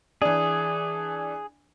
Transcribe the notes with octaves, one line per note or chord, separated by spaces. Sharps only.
E3 D4 G#4